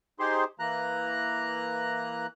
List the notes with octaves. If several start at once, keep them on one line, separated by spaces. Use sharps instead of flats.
D#4 G4 G#4 C5 C6
E3 A#3 A#5 F#6